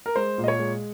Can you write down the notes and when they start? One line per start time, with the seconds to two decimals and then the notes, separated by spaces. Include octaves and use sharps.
0.06 A#4
0.16 G#3 C5
0.38 A#2
0.44 D#5
0.48 C#5
0.59 G#3